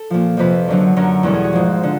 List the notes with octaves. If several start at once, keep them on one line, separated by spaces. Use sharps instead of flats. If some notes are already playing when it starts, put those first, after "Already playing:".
Already playing: A4
A#2 F3
F2 C3 F3 B4
F#2 D3 F#3
F#2 D3 F#3 A#4
E2 B2 G3 A4
G#4
F#4
G#2 F3
D3